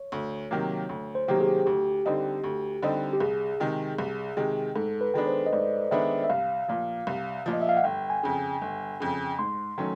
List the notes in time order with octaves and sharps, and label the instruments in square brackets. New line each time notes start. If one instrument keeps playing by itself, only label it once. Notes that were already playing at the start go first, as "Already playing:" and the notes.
Already playing: [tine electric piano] C#5
[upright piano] D2
C3 D#3 F#3 A#3
D2
[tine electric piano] C5
[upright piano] C3 D#3 F#3 A#3 [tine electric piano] G4
[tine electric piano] G#4
[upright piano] D2 [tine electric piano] G4
[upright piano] D3 G3 C4 D#4
D2
D3 G3 C4 D#4
[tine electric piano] G4
[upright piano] C2 [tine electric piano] G#4
[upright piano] C3 D#3 G#3
C2
C3 D#3 G#3
[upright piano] G#2 [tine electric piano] A4
[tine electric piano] B4
[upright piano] D#3 G#3 B3 D4
[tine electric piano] C5
D#5
[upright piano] G#2 [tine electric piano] D5
[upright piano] D#3 G#3 B3 D4 [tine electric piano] E5
[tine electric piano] E5
[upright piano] C2 [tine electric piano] F5
[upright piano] A#2 F3
C2
A#2 F3
[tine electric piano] D#5
E5
F5
F#5
[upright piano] G1 [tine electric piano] G5
[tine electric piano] G#5
[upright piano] F2 C#3
G1
F2 C#3
[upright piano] G#2 [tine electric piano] C6
[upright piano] D#3 F#3 A3 C#4